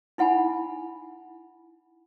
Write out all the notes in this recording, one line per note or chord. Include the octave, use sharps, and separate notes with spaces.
D#4 E4 F#5 G#5 B5